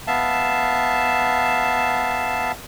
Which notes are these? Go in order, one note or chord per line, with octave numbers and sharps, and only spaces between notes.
B3 E5 F5 A5